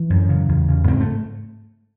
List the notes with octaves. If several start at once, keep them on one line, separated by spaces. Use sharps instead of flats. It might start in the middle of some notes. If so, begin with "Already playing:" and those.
Already playing: E3
F#2
C#3
E2
C#3
G#2 C4
A3